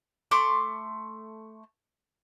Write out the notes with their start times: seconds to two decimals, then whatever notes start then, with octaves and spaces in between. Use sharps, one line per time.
0.31 A3 C6 D6